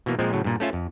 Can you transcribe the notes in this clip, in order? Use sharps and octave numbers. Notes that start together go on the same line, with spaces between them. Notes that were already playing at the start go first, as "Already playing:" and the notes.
B2 E3 A#3
A#2 F3 G#3 C4
A2 C#3 F#3
G2 A#2
A3 C#4 F4 E5
F2